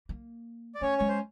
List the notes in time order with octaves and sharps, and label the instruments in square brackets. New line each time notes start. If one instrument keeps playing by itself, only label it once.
[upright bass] A#3
[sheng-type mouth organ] D5
[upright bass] A3 [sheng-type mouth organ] C#4 C#5
[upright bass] G#3 [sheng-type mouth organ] C#5
[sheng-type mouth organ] C5